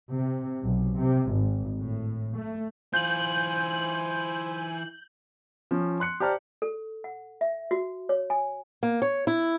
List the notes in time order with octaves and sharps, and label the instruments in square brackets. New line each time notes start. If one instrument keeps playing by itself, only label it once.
[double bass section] C3
B1
C3
G#1
A2
A3
[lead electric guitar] E3 F4 [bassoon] C5 [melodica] G#5 [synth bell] G6 F#7
[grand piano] F3 C#4
C6 F#6 C#7
G4 C5 D5 A5 A#5 F6
[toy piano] A4
F#5
E5
F#4
C#5
G#5
[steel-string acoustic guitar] A#3
C#5
E4